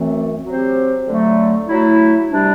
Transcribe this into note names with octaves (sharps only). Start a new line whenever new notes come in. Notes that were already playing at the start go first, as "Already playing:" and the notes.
Already playing: F#2 E3 A3 C4
F#3 C4 G4 C5
D3 F#3 A3
F#3 A3 E4
C3 G3 D4